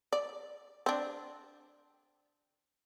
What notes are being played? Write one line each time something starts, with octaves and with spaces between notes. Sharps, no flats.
D5
C4 D4